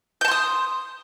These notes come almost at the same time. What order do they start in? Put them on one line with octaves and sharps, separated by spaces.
G6 A5 C6 D#6